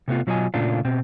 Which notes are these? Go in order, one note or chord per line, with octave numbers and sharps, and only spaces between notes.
C3 A3 B3 F4
B2 F#3 F4 G#4 D#5 G#5
A#2 C#3 A3 D4 F4
B2 C4